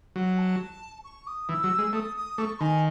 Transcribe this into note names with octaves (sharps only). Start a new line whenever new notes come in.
F#3 F#5
A5
C#6
D#6
E3 E6
F#3
G#3
A3 D#6
D#6
A3 C#6
D#3 G#5